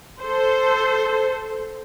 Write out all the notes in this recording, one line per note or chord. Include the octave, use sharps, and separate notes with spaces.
A4 C5